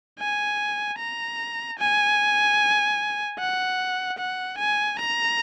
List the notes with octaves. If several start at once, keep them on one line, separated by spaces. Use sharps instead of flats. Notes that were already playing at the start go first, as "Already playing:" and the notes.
G#5
A#5
G#5
F#5
F#5
G#5
A#5